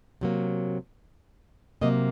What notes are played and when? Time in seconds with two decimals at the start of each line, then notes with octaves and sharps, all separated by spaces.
0.21 C3 F#3 A#3
1.81 C3 F#3 A#3 D#5